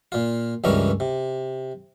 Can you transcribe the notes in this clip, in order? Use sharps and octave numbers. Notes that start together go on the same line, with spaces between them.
A#2 F4
C#2 G2 E3 C#4 A#4
C3